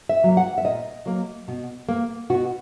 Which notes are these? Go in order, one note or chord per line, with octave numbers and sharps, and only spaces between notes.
E5
F#3 A#3
F#5
E5
A#2 D#5
F#3 A#3
B2
A#3
B2 F#4